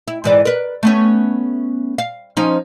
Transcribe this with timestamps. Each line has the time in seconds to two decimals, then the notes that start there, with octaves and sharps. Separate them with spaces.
0.08 E4
0.24 G#2 E3 D5
0.45 A#4 B4
0.83 A3 B3 C#4
1.98 F5
2.37 F3 C#4 D#4